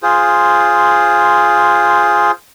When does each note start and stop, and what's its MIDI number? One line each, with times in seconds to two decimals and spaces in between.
0.03 2.31 65
0.03 2.31 68
0.03 2.31 72